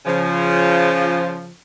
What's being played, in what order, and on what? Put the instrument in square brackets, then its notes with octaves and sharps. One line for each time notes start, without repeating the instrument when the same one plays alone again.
[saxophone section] C#3 F3